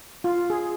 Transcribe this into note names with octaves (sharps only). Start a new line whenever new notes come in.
F4
G#4